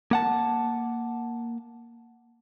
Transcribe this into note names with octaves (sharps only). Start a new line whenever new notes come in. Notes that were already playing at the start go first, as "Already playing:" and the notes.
A#3 F#5 A5